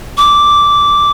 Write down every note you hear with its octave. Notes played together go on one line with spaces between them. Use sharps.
D6